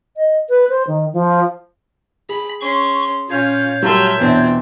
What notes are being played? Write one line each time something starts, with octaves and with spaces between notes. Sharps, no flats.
D#5
B4
C5
D#3
F3
G#4 B5
C#4 C6 C#6
A#2 C#4 F4 C#5 F5 G6
F#3 G3 A3 A#4 E5 C6
E2 B2 C4 D4 E5